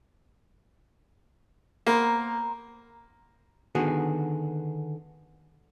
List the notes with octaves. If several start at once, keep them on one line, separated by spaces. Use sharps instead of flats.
A#3 B3 C5 A#5
D3 D#3 B3 F#4 G#4